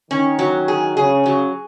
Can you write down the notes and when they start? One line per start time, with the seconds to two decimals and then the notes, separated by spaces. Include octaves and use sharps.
0.11 D#3 C#4
0.39 F#3
0.68 G#4
0.97 C#3 G#4
1.26 F#3